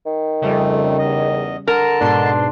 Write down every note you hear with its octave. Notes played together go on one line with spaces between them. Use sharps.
D#3
F2 C#3 G3 A3
E2 D#5
D3 A#4 A5
G#2 B2 D4 C6